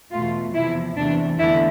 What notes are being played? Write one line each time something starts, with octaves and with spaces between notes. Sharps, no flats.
E2 B2 A3 F4
E2 C3 F3 E4
E2 C3 E3 A3 D4
E2 D3 A3 E4